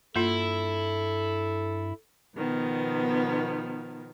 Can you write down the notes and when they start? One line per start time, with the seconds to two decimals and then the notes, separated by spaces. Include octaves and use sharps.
0.16 G2 A#3 E4 F4 A4
2.37 B2 D#3 F3 B3